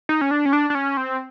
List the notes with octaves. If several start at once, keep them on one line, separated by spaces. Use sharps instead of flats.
D#4
C#4
D4
C#4
D4
D4
C#4
C4